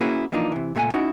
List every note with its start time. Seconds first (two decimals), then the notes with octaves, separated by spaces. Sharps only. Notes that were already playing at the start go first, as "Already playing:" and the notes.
0.01 A#3 C#4 E4 F#4 G#4 B4
0.32 E3 F3 A#3 D4 D#4 F4
0.52 C3 E3
0.75 C#2 A#2 A3 E4 F#5 G#5
0.94 C#4 D#4 E4 F#4